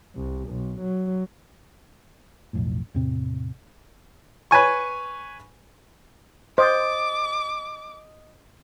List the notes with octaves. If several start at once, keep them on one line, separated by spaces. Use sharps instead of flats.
C2
B1
F#3
B1 F2 A2
E2 A2 C3 C4
B4 C#5 G#5 C#6
C5 D#5 D6 D#6 A6